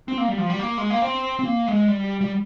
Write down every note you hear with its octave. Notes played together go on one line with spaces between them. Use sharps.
C4
A#3
G3
F3
G3
A#3
G#3
A#3
C4
C4
A#3
G#3
G3
G3